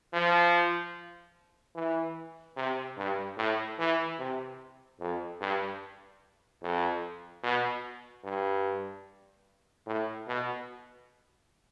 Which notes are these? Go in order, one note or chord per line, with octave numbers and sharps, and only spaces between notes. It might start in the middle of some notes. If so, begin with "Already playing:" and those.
F3
E3
C3
G2
A2
E3
C3
F2
G2
F2
B2
G2
A2
B2